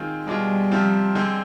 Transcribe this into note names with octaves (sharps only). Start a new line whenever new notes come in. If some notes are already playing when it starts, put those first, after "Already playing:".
Already playing: D#3 G#3 C4 F4
B2 G3 G#3 D4 F4
C3 F3 C4 F4
D3 G#3 C4